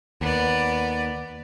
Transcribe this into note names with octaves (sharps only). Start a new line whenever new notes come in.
D#2 B3 D5